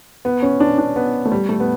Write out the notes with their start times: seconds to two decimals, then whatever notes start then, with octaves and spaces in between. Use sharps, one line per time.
0.25 B3
0.42 C#4
0.60 D4
0.78 D4
0.96 B3
1.25 A3
1.32 G3
1.49 A3
1.60 B3